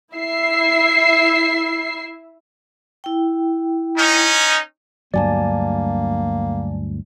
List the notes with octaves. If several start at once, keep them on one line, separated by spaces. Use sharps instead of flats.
E4 E5 C7
E4 G5
C#4 D#4
D2 G2 F#3 A#3 D5 G#5 A5